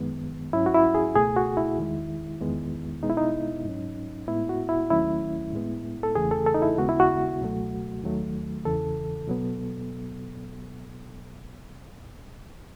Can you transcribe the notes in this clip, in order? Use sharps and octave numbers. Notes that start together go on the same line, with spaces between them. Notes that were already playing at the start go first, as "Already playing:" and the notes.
Already playing: F#2 D#3 G#3 B3
G#2 F#3 C#4 E4
F#4
E4
G#4
C#2 B2 A3 G#4
F#4
E4
E2 D#3 G#3
E2 D#3 G#3 B3
B2 G#3 B3 D#4
E4
D#4
G#2 F#3 C#4
A2 G#3 B3 E4
F#4
E4
D#2 D#3 F#3 A3 C#4 E4
A2 G#3 B3
A4
E2 C#3 E3 A3 G#4
A4
A4
D#4
E4
D#2 C#3 G#3 B3 F#4
E4
F#4
C#2 B2 F#3 A3
D#2 D#3 F#3 A3
E2 C#3 E3 A4
B2 F#3 B3